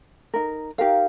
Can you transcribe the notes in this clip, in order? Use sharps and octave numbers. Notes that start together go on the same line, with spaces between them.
D#4 A#4
D#4 G4 A#4 F5